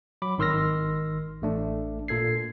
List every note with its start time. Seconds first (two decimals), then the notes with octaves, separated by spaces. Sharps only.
0.22 F#3 B5 D6
0.38 G#1 D#3 C6 E6 F6 A#6
1.42 A1 A3 D4
2.08 A#2 A4 G#6 C7